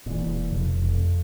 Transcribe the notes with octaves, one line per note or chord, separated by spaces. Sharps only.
F1 A#2 E3
E1
F1
F2